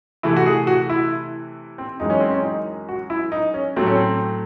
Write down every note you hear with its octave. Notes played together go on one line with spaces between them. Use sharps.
C3 E3 A3 E4
F#4
G#4
F#4
E4
C4
F#2 E3 G#3 D#4
C#4
C4
C#4
D#4
F#4
E4
D#4
C#4
A2 F#3 A3 C4
C#4
C4